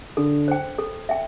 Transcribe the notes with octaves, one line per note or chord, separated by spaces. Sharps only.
D3 A4
C5 G5
A4
E5 G5